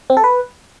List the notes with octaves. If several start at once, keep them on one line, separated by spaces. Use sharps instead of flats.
C4
A4
B4